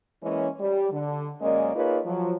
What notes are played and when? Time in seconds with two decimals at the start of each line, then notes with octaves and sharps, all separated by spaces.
0.23 E3 G#3 A#3 C#4
0.60 G3
0.92 D3
1.41 F#2 G#3 A#3 C#4 D5 D#5
1.75 A#3 D#4 F4 G#4 B4 C#5
2.05 F3 F#3